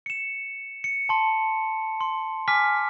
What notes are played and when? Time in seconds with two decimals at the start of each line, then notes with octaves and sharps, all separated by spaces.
0.06 C#7 E7
0.84 C#7
1.09 A5 C6
2.01 C6
2.48 G#5 D6 F6 B6